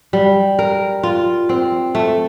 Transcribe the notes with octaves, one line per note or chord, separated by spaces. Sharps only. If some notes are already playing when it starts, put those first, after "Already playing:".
G3
A#4
F4
C4
A3